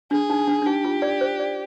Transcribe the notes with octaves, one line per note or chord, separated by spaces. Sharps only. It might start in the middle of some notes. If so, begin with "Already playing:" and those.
D4 G#4
D#4
D4
D4
D#4 G4
F4
D5
C5
D5